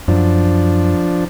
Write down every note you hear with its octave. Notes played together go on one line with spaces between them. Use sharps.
F#2 F3 F#3 D4